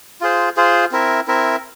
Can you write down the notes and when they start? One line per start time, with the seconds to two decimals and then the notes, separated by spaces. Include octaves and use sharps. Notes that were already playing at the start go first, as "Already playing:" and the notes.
0.21 F4 G#4 C5
0.57 F4 G#4 C5
0.92 C4 E4 A#4 E5
1.27 C4 E4 A#4 E5